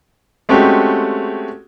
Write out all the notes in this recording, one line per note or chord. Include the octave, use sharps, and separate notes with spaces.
G#3 A3 C4 C#4 F#4 G4